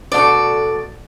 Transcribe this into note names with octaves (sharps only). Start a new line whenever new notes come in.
B2 A3 D4 F#4 A4 D5